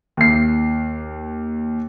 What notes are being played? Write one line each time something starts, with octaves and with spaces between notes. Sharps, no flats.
D#2 C7